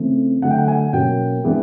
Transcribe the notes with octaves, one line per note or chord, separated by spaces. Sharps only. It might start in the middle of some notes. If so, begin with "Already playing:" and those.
Already playing: C#3 E3 A3 C4
D3 F#3 A3 F#5
G5
F#5
G#5
B2 F#3 A#3 C#4 G5
E3 G#3 B3 D4